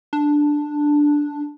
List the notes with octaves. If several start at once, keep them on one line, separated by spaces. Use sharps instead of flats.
D4